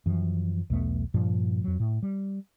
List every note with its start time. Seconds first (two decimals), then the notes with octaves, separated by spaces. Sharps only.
0.06 F#2 E3 F3
0.70 B1 E2 A3 B3
1.14 G2 A#2 F3 A#3
1.64 F2 F#3
1.80 A2
2.03 G3